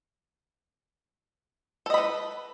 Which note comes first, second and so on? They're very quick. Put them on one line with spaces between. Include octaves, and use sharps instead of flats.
A4 D#5 B5 B4